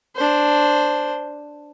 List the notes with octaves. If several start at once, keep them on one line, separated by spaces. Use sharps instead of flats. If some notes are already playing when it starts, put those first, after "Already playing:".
D4 C5